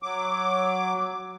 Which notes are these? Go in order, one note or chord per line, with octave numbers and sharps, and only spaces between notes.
F#3 D6